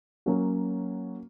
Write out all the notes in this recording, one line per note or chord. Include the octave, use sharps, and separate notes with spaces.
F#3 A#3 C#4 F#4